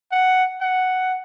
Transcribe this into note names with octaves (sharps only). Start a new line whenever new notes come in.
F#5
F#5